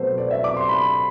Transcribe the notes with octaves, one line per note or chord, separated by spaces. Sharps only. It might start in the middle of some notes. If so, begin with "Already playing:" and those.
Already playing: B2 F#3 A3 F#4 A4 B4 C5
D5
E5
D6
C6
B5